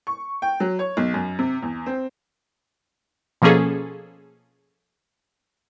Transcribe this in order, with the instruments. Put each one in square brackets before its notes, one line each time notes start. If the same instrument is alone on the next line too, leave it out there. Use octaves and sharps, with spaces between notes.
[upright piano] C#6
G5
F#3
C#5
B1
F#2
C3
E2
C4
[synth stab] B2 F3 A#3 C#4 G#4 A4